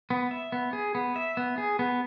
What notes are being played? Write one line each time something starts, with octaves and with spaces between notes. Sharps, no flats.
B3
E5
B3
G#4
B3
E5
B3
G#4
B3